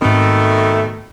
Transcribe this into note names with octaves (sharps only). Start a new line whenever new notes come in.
G#2 B2 D#3 A3 C4